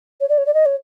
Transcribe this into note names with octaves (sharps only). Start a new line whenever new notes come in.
C#5
D5
C#5
D5
D#5
C#5